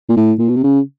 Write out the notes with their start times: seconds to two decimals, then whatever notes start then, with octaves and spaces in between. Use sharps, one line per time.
0.09 A#2
0.17 A2
0.39 A#2
0.49 B2
0.56 C3
0.64 C#3